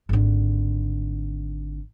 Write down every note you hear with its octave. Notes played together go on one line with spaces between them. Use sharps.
G#1 D3